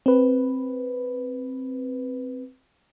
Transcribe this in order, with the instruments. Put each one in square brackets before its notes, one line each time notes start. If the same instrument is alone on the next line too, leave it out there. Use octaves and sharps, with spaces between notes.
[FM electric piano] C4 B4